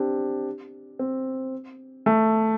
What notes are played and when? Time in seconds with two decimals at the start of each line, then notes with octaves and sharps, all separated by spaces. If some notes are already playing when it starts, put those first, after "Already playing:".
Already playing: C4 D4 G4
0.99 C4
2.06 A3